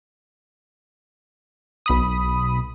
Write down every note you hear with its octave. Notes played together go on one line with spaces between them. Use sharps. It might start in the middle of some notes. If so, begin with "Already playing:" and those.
B1 B5 D#6